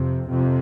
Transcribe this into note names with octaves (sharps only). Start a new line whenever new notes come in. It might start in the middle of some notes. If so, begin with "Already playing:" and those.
Already playing: F2 C3
F2 C3